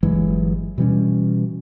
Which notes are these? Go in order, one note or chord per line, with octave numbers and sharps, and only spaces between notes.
G1 E3 F#3 G#3
B2 E3 G3 C#4